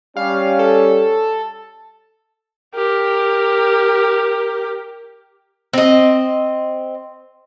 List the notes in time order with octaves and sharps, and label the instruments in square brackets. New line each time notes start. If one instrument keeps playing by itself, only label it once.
[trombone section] G3 C#4 [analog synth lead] F5
[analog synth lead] A4
[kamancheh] G4 A#4
[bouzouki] C4 D#5